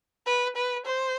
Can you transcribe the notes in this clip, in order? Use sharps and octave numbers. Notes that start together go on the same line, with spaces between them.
B4
B4
C5